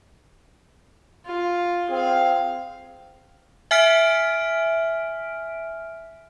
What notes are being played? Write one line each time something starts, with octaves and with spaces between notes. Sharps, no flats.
F4
C4 G#4 F5
E5 G#5 F6 B6 D7